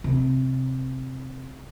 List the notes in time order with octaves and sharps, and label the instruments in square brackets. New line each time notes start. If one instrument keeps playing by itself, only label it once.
[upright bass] C3